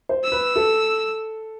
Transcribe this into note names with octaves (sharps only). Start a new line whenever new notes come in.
C5
E6
B4
A4